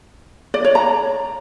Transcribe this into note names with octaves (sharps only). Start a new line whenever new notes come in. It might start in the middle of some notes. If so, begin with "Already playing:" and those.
D5
C#5
A#5